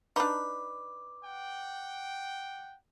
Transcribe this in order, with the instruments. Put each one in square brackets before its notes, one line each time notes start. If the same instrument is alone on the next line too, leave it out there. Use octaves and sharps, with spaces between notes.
[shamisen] D4 D#4 [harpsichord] B4 [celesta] D6
[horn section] F#5 G5